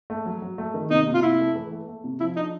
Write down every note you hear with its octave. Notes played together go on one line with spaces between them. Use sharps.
A3
F#3
F#3
A3
D#3
C3 D#4
C3
F4
C3 E4
A3
E3
A3
A3
C3
F3 E4
D4 D#4